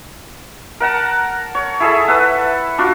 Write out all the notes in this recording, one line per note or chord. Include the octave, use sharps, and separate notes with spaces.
A#4 F#5 A5 A#5
C#5
E4 G#4 A4 E5
A4 B4 E5 F#5
D4 F4 F#4